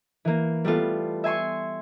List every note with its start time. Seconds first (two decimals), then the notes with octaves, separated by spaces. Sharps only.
0.25 E3 A#3
0.64 G3 A3 B3 F4
1.24 E5 G#5 C6 C#6